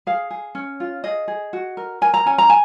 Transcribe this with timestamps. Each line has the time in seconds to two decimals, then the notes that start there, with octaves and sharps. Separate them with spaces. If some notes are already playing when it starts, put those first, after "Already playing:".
0.07 G#4 F5
0.31 G#4
0.55 C#4
0.80 F4
1.04 G#4 D#5
1.28 G#4
1.53 F#4
1.77 A#4
2.02 A#4 G#5
2.14 A#5
2.26 C#4 G#5
2.38 A#5
2.49 G#5